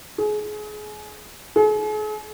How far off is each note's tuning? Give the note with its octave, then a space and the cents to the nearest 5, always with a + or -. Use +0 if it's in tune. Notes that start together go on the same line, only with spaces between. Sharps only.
G#4 +30
G#4 +45